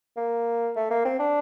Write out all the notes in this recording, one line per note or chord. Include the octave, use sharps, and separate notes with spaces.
A#3
A3
A#3
C4
D4